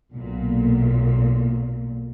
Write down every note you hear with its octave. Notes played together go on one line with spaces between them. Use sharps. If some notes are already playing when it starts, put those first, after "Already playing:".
B1 A#2